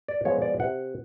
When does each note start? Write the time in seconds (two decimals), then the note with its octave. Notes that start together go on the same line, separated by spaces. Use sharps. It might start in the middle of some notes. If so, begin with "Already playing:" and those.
0.08 D5
0.25 F3 G#3 B3 C#5
0.42 D5
0.60 C3 F#5